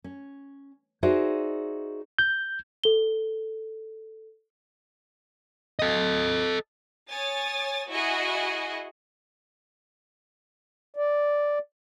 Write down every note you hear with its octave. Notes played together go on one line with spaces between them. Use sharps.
C#4
D#4 F#4 G#4 C5 D5 E5
G6
A4 G7
A4 D#5
C#5 G#5 D#6 A6
E4 F#4 G#4 D#5
D5